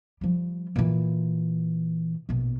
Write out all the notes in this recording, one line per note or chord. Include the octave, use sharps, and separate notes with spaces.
F3 G3
A#2 E3
A#1 B2